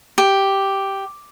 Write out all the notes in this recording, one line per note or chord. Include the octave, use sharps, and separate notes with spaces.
G4